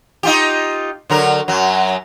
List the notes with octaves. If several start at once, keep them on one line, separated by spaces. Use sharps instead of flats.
D#4 F4 G4
D3 F#3 A#4
F#2 F#3